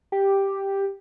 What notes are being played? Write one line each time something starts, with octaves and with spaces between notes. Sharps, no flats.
G4